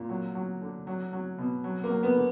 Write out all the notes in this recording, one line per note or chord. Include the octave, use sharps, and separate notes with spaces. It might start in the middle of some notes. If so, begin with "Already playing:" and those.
Already playing: A#2
F#3
F#3
D3
F#3
F#3
B2
F#3
A#3
F#3
B3
D3